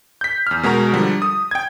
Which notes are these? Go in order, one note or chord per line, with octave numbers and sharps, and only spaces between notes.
G6 B6
E2 F6
B2 G#3 F#4 A#4 A#5
D3 F3 G3
D#6
G5 G#6